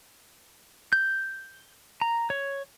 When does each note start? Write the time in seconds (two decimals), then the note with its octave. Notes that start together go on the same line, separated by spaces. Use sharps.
0.93 G6
2.01 A#5
2.30 C#5